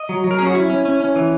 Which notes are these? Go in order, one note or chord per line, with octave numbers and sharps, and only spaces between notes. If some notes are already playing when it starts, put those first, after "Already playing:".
Already playing: D#5
F#3
F#3
A#4
C#4 G#4
F#4
C#4 E4
C#4
C#4
C#4
E3